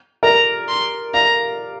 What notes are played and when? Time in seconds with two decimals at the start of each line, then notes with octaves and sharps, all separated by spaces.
0.23 A#4 D5 A#5
0.68 C6
1.14 D5 F5 A#5